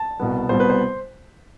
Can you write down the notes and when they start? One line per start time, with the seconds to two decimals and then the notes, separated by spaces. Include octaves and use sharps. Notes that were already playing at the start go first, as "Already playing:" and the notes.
Already playing: A5
0.20 C2 B2 G3 B3
0.49 C2 B2 G3 B3 C5
0.60 B4
0.70 C5